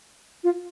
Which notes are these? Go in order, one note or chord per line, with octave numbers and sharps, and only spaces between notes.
F4